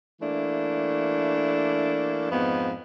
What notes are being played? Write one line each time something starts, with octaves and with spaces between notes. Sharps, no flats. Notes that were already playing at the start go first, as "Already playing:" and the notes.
E3 A3 A#3 D4
F2 G#2 B3